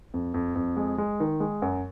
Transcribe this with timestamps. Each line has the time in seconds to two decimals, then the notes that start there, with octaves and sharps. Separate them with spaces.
0.14 F2
0.34 F2
0.56 F2
0.77 G#3
0.98 G#3
1.20 D#3
1.40 G#3
1.62 F#2